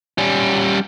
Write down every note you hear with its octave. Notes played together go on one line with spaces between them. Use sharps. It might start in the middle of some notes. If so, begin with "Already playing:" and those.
G3 C#4